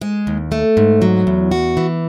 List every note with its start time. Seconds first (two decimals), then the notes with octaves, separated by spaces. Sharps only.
0.01 G#3
0.27 D#2
0.52 A3
0.77 G#2
1.02 F#3
1.27 E2
1.51 F#4
1.77 E3